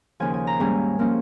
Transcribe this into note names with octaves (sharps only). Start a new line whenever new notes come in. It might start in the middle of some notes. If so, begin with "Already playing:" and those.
D#2 C#3 F3 G#5
G#5
A#5
G#2 G3 A#3 C#4 G#5
F3 A#3 C#4